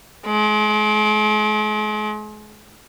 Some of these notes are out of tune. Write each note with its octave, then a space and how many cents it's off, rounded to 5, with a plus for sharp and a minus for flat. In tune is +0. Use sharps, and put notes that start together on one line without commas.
G#3 +40